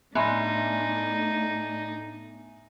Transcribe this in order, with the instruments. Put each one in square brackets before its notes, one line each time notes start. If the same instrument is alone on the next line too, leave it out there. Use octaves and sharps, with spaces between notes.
[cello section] A2 A3 D4 [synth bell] B3 [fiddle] D#4 [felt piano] E5 G#5 C6